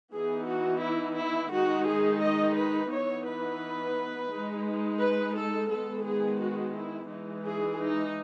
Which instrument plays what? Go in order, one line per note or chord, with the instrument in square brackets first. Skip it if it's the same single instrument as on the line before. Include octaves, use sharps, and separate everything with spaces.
[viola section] E3 B3 D#4 G#4
F#4
E4
E4
D#3 G#3 D#4 F#4
G#4
D#5
B4
E3 B3 D#4 C#5
B4
G#3 D#4
B4
A4
D#3 G#3 B3 A4
G#4
F#4
E4
E3 G#3 D#4
G#4
D#4